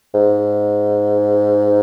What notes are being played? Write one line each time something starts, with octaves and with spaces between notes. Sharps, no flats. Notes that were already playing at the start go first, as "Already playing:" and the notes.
G#2